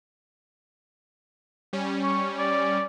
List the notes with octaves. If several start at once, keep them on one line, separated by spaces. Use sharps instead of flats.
G3 C#4
C#6
D5